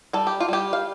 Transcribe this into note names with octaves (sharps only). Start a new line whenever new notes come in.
G3 A4
G4
F4
G3 G4
F5